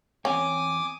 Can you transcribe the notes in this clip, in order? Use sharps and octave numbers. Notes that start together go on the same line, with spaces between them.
E2 C4 C#4 G5 G#5 D6 D#6